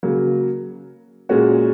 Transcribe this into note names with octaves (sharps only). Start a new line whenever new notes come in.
C#3 F#3 A#3
A#2 G#3 C#4 F#4